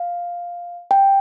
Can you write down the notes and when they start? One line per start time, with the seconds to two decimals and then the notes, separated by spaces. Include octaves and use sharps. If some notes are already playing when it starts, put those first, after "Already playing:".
Already playing: F5
0.91 G5